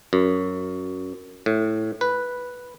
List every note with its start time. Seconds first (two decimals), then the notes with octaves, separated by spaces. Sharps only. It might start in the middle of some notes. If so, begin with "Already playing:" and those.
0.13 F#2
1.46 A2
2.01 B4